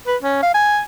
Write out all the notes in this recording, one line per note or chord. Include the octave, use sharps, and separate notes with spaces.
B4
C#4
F5
G#5